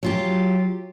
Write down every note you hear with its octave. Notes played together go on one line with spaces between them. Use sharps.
F#3 F4 G4